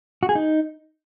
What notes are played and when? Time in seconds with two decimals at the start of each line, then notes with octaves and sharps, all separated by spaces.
0.23 F#4
0.29 G#4
0.35 D#4